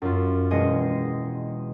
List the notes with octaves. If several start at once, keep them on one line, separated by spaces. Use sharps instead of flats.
F#2 F4
E1 G#3 G#4 D#5 C7 C#7